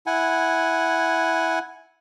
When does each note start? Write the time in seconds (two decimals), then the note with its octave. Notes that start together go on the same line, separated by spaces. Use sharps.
0.06 E4 F#5 G#5